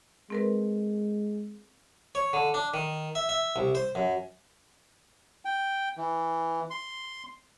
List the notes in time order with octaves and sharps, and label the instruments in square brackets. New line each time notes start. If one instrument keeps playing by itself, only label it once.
[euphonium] G#3 [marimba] C4 A#4 B4
[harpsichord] C#5
D3
D4
D#3
E5
E5
C2
C5
F#2
[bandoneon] G5
E3
C6